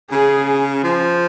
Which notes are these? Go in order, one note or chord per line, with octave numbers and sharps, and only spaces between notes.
C#3 G#4
F3